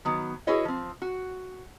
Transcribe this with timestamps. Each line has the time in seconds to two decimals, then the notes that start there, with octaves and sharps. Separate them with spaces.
0.05 D#3 F#3 B3
0.47 E4 F#4 G#4 B4 C#5 D#5
0.65 F3 C4
1.02 F#4